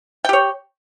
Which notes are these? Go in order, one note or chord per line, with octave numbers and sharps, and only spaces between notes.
G4 C#5 G5